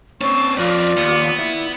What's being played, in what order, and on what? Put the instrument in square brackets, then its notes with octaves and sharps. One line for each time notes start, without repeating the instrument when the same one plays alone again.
[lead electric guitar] C4 C#4 [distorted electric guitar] A5 [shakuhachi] C#6
[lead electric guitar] F2 [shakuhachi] F4 [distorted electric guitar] A#4 B4 [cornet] D5
[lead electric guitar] D#2 [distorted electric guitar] B3
[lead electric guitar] E4